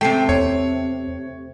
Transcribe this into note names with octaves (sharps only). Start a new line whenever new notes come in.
C3 A3 G5 C7
E2 C#5